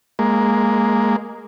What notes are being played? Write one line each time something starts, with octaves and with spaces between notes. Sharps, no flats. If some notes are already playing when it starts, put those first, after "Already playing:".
G#3 A#3